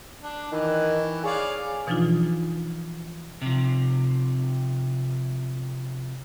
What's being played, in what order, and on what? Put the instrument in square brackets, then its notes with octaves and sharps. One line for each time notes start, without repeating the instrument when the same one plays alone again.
[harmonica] D4
[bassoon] D#3 [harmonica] E3
[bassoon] G#4 [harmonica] C#5 D5 F5
[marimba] B2 E3 F3 D4 D#4 F4
[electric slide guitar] C3 F3